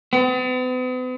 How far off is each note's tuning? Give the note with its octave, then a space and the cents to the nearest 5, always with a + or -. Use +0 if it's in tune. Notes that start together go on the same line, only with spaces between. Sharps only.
B3 +45